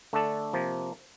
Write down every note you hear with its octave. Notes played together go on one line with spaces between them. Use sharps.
D3 A3 D4 A4
C3 F3 A#3